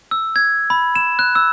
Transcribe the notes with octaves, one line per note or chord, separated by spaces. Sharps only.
E6
G#6
B5
E7
F#6
E6